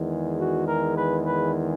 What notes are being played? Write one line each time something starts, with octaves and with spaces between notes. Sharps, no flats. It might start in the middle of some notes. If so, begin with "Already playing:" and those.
Already playing: E2 D#3 G#3
F#4
A#4
B4
B4